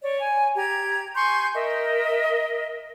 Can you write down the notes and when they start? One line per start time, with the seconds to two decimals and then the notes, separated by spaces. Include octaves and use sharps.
0.02 C#5 D5
0.19 G#5
0.56 G4 A#5 G#6
1.15 G#5 C6 C#6 G6
1.54 A#4 D#5 E5